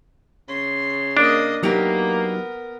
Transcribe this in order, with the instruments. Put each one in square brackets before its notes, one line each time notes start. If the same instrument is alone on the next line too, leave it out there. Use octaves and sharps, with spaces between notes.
[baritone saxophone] C#3 [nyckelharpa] C6
[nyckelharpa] A#3 D#5 [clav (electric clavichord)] D4
[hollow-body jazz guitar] F#3 D#4 G4 [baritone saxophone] A#3 [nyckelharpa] B3 A#4